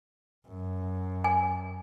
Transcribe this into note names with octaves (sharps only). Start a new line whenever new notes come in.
F#2
G#5